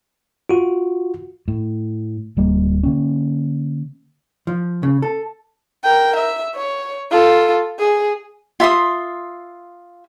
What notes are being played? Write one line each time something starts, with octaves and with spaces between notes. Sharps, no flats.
F4 F#4
A2
D1 G3 A#3
D3 A#3 C#4
F3
C#3
A4
A#4 G5
E5
C#5
F4 A4
G#4
F4 E5 C6 D#6